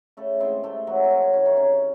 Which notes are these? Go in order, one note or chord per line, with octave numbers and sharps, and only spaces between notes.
C#3 A3 A4
E3 G#3 C4 C5
C3 A3 A4
E3 F#3 G#3 F#4
C4
F#2 C#4
C#4
C#3 E3 C#4
D#3 D#4
C3 C#4